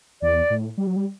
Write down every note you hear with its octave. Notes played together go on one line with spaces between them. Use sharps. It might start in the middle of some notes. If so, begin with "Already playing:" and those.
E2 D5
A2
G3
F#3
G3